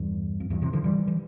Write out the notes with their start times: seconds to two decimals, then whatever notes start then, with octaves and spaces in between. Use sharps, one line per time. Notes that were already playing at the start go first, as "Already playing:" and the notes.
Already playing: E2 G2
0.40 F2
0.50 E2 G2
0.62 C3 E3
0.73 D3 F3
0.84 E3 G3
1.08 E3